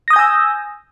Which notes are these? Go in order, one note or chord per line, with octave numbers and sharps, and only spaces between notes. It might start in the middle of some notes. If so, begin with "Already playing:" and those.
G#5 D#6 E6 G6 A#6